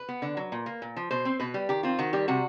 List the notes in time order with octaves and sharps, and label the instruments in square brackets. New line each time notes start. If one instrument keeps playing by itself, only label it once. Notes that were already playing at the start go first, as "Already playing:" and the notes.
Already playing: [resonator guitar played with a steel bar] B4
B3
D3
F#3
A#2
A#3
A#2
F3
B2 C5
C4
B2 B4
G3
D#3 G4
C4 F4
D#3 F#4
G3 G4
C3 F#4